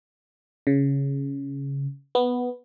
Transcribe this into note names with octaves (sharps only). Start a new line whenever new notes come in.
C#3
B3